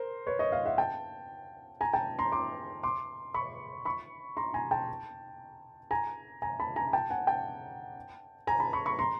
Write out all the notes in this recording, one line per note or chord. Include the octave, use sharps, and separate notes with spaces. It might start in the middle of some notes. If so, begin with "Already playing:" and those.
Already playing: A#4 C5
B4 C#5
C#5 D#5
D#5 F5
E5 F#5
G5 A5
G#5 A#5
G5 A5
A#5 C6
C6 D6
C6 D6
B5 C#6
B5 C#6
A#5 C6
G#5 A#5
G5 A5
G#5 A#5
G#5 A#5
A5 B5
G#5 A#5
G5 A5
F#5 G#5
G5 A5
G#5 A#5
A5 B5
B5 C#6
B5 C#6
A#5 C6